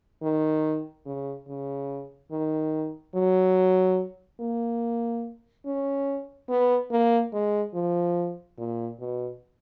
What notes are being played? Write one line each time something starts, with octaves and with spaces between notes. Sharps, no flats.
D#3
C#3
C#3
D#3
F#3
A#3
C#4
B3
A#3
G#3
F3
A#2
B2